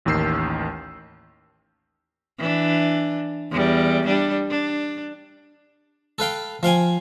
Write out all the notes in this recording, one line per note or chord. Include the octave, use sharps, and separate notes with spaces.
A1 D#2 D#3 E6 G6 C7
E3 D4
E2 G3
G3 D4
D4
A4 B4 F5 G5
F3 F5 G5 G#5